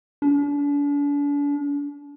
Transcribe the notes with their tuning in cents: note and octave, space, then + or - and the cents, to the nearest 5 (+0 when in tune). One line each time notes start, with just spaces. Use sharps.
D4 -40